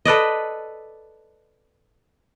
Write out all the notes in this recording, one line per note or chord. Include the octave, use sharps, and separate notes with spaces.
A4 B4 D5 D#5